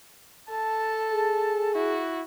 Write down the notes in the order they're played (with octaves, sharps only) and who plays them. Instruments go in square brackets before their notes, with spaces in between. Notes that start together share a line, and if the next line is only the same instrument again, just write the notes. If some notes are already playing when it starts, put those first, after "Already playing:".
[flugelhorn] A4 [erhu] A5
[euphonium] G#4
[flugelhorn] E4 [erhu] F#4